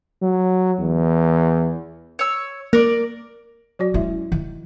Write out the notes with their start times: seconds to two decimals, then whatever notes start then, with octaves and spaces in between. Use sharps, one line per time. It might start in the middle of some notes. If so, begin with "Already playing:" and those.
0.22 F#3
0.79 E2
2.19 C#5 E6
2.73 A#3 A#4 D5
3.79 F#3 F#4 D5
3.94 G#3 C#4 E4 E5
4.32 D#3